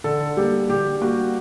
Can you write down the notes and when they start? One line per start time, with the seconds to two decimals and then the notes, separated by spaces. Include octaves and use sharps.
0.04 D3 A4
0.37 G3 A#3 G4
0.70 D3 G4
1.01 G3 A#3 F#4